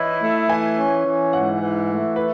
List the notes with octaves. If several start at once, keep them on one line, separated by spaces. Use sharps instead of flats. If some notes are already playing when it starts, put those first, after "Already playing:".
Already playing: E3 E4 C#5 D#5 E5
A3
E3 G#5
C#4
E3
G#2 F#5
E3
A3
B4